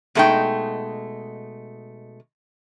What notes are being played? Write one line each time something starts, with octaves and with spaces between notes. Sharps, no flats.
B2 G#3 A3 D4 D#4 G5